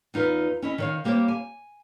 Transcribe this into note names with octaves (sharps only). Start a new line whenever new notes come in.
E2 D#4 F4 B4
C#4 E4 D#5
D#3 C#5 F5
G3 A#3 G4 G#4 C5 C#5
G#5